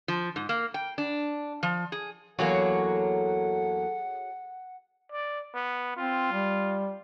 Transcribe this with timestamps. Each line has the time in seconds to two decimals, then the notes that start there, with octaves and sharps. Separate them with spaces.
0.08 F3
0.36 G#2
0.49 A#3
0.74 G5
0.98 D4
1.63 F3
1.92 G#4
2.39 E2 F#3 A#3 F#4 G#4 A4 C#5 F#5
5.12 D5
5.54 B3
5.96 C4 F4
6.32 G3